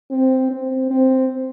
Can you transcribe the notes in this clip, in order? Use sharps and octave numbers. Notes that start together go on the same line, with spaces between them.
C4
C4
C4